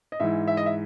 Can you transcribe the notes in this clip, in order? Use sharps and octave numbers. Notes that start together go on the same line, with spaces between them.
D#5
G#2 E3 E5
E5
D#5
E5